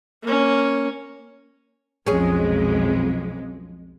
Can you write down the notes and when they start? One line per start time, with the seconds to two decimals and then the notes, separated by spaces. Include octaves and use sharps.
0.23 A#3 C#4
2.07 B1 F2 G#3 C#4 G#4